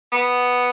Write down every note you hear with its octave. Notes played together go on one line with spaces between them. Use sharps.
B3